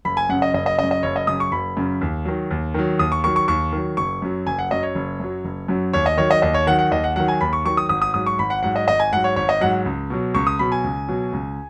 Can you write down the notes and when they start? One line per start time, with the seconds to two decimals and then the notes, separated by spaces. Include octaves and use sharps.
0.05 F#1 B5
0.17 G#5
0.29 F#2 C#3 F#5
0.42 D#5
0.54 F#1 D#5
0.66 D#5
0.79 F#2 C#3 D#5
0.91 D#5
1.03 F#1 C#5
1.16 D#5
1.27 F#2 C#3 D#6
1.40 C#6
1.52 F#1 B5
1.77 F#2 C#3
2.01 D#2
2.25 D#3 F#3
2.51 D#2
2.74 D#3 F#3
2.99 D#2 D#6
3.12 C#6
3.24 D#3 F#3 C#6
3.36 C#6
3.48 D#2 C#6
3.72 D#3 F#3
3.97 F#1 C#6
4.22 F#2 F#3
4.47 F#1 G#5
4.59 F#5
4.71 F#2 F#3 D#5
4.83 C#5
4.95 F#1
5.20 F#2 F#3
5.45 F#1
5.68 F#2 F#3
5.93 D#2 C#5
6.06 D#5
6.17 D#3 F#3 C#5
6.31 D#5
6.42 D#2 D#5
6.54 C#5
6.67 D#3 F#5
6.70 F#3
6.79 F#5
6.91 D#2 D#5
7.04 F#5
7.16 D#3 F#3 F#5
7.28 G#5
7.41 D#2 B5
7.53 C#6
7.65 D#3 F#3 C#6
7.77 D#6
7.89 G#1 D#6
8.02 D#6
8.14 G#2 F#3 D#6
8.26 C#6
8.39 G#1 B5
8.50 F#5
8.63 G#2 F#3 F#5
8.76 D#5
8.88 G#1 D#5
9.00 G#5
9.13 G#2 F#3 F#5
9.24 C#5
9.36 G#1 C#5
9.49 D#5
9.61 G#2 F#3 F#5
9.86 C#2
10.10 B2 F#3
10.34 C#2 C#6
10.47 D#6
10.59 B2 F#3 B5
10.72 G#5
10.84 C#2
11.08 B2 F#3
11.33 C#2